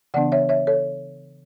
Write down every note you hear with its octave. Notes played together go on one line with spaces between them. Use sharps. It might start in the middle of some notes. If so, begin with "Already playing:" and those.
C#3 E3 B3 D4 D5 F#5
C#5 E5
C#5 E5
A4 C#5